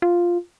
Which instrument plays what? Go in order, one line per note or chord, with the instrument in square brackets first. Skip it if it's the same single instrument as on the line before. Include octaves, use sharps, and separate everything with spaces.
[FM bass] F4